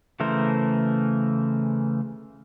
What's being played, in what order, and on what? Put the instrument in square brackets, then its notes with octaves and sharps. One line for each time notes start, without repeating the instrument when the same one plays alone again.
[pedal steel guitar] C#3 E3 A3 A#4 C5